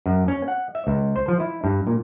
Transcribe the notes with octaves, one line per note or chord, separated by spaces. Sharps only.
F#2
C#4
F#5
E5
C#2
C5
F3
E4
G2
A#2